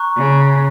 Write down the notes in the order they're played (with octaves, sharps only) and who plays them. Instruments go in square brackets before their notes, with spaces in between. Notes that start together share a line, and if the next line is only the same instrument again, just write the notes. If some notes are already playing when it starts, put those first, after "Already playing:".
Already playing: [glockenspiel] A#5 C#6 F#6
[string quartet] C#3